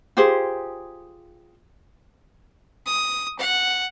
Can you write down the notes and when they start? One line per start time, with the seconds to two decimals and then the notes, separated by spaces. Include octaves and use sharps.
0.17 F4 G4 G#4 C5
2.86 D#6
3.39 F#5